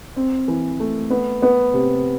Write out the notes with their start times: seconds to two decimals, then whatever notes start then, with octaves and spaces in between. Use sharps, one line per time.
0.16 C4
0.48 E3
0.80 A3
1.10 B3
1.42 B3
1.74 C3